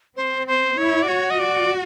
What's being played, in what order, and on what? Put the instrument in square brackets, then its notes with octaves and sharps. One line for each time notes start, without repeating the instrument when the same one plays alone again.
[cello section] C4 [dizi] C5
[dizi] C5
[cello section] E4 [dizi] C#5
[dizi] D5
[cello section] F#4 [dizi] C#5
[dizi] D#5
D5